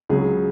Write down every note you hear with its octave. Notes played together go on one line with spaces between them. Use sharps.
C#2 C#3 F#3 G#4